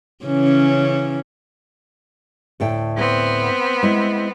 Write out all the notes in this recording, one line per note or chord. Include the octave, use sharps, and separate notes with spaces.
C#3 E3 C#4
D2 A2 G5
B3 C4
G#3 E4